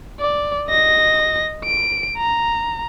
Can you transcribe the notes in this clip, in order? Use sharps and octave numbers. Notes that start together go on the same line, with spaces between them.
D5
D#5 A#6
D7
A#5